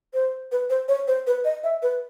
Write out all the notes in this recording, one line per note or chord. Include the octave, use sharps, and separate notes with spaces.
C5
B4
C5
C#5
C5
B4
D#5
E5
B4